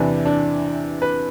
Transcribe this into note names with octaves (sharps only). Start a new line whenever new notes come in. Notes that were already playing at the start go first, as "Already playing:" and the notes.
Already playing: E2 C3 E3 D4
D4
B4